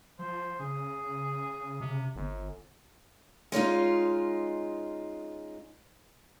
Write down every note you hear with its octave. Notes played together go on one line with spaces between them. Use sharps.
F3 C5
C#3 G#4
C3
G1
G#3 C#4 D#4 F4